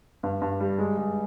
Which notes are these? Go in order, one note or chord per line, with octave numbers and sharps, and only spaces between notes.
G2
G2
G3
G#3
G#3